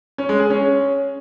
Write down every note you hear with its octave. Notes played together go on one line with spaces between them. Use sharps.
C#4
G#3
G#4
C#4